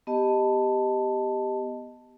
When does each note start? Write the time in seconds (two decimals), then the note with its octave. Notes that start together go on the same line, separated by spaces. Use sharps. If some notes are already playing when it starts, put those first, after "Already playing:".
0.07 B3 G4 D#5 A5